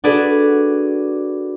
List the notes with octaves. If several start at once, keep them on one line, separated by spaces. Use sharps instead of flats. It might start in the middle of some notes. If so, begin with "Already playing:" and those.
D4 F#4 G#4 A4 B4 D5